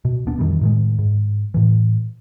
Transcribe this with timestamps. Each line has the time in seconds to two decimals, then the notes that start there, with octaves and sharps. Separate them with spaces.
0.05 B2
0.27 D#1 B3 D4
0.39 F2 D#3 E3 G3
0.61 A2 D#3 G#3
0.99 G#2
1.54 A2 E3